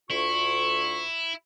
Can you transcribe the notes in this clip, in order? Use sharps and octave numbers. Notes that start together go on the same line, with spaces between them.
D2 E4 F4 C#6